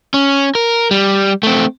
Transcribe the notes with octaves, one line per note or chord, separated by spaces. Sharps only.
C#4
A#4
G3
A3 C4